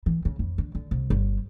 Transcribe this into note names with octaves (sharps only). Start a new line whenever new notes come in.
E3
C#3
F2
D3
D3
C2
G1